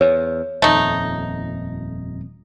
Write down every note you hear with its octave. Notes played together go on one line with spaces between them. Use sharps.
E2 C#5
D#1 F2 A3 D#4